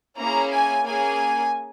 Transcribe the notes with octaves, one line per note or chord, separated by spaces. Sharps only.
A#3 C#4 E4 G#4 A#5
G#5
A#3 C#4 G#4 G#5